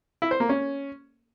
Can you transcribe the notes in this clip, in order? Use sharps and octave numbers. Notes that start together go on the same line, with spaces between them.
E4
C5
A#3
C#4